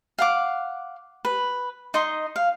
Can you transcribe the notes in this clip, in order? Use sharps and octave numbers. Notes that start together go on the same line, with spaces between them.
F5 F#5 D6
B4
D#4 D#5 C6
F5